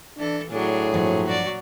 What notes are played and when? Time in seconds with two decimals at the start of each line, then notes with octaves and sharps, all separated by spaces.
0.18 E3 D4 A4
0.52 A2 F#3 D4 G#4
0.92 G2 A#2 F3 F#3
1.27 F#4 D5